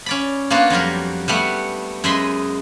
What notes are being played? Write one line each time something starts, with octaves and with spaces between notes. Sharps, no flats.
C#4 D5 B5
A#3 B3 D4 F4 F#4
F2 F#3 G3 A#4
G3 A3 B3 F#5
F#2 G#3 D#5 E5 B5 C6